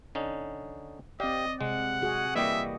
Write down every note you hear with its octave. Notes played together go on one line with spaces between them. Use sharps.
D3 C#4 D#4
C4 G4 D5 D#5 F5
C3 G#3 F#5
F#4 G#4
E3 G3 A#3 G4 D#5 E5